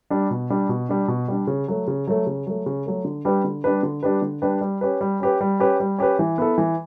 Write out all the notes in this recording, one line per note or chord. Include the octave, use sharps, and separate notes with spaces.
G3 D4
B2
G3 D4
B2
G3 D4
B2
G3 D4
C#3
F#3 A3
C#3
F#3 A3
C#3
F#3 A3
C#3
F#3 A3
D3
G3 D4 G4 B4
D3
G3 D4 G4 B4
D3
G3 D4 G4 B4
D3
G3 D4 G4 B4
G3
C#4 G4 B4
G3
C#4 G4 B4
G3
C#4 G4 B4
G3
C#4 G4 B4
E3
B3 E4 A4
E3